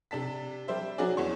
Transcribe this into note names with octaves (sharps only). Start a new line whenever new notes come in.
C3 D4 A5 B6
G3 G4 C5 E5
F#3 C#4 D4 F#4 G#4 D5
E2 E3 C#5 C#6